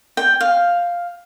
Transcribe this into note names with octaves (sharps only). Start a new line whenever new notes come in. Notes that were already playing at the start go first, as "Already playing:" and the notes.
G5
F5